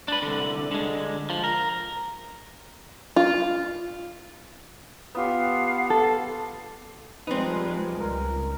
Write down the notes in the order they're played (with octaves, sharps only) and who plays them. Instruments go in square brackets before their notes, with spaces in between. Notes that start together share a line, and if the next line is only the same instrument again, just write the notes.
[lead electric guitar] D4 B4
C2 D3
D3 G#3
F3
A#4
[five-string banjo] F4
[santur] B3 F4 G4 [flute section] F5 F#5 A5
[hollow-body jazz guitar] A4
[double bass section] F3 G3 G#3 [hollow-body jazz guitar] C4 D#4 [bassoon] B4
[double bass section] C#2 [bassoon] A#4